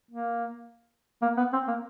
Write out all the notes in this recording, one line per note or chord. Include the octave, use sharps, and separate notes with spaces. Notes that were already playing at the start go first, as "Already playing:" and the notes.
A#3
A#3
B3
C4
A#3